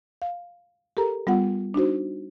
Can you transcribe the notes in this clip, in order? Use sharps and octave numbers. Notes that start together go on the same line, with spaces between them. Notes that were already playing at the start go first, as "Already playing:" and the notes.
F5
G4 A4 A#4 A#5
G3 B3 F4 F#5
D4 D#4 F#4 C5